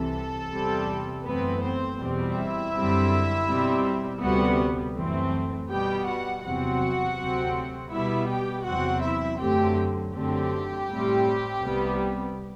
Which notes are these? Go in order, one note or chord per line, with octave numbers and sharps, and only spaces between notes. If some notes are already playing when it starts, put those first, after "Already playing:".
Already playing: C2 C3 E3 A4
E2 C3 G3 C4
F#2 E3 A3 B3 C4 B4
C4 C5
E2 B2 G3 C4
E4 E5
F#2 D3 G3 C4
B2 G3 C4
D2 C3 G3 B3 F#4 F#5
F#2 E3 A3 C4
B2 G3 B3 G4 G5
F#4 F#5
E2 C3 F#3 C4 F#4 F#5
D2 C3 F#3 C4
B2 G3 B3 E4 E5
G4 G5
E2 C3 F#3 C4 F#4 F#5
E4 E5
F#2 D3 F#3 A3 C4 G4 G5
F#2 D3 A3 C4 G4
A2 G3 C4
C2 C3 G3 B3